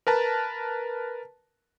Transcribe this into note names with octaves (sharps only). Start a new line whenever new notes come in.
A#4 B4 A5 A#5